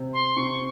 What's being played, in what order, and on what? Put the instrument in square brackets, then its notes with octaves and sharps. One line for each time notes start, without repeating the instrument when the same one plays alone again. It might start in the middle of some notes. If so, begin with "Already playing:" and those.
Already playing: [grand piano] C3
[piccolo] C6
[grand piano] C3 [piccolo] C#6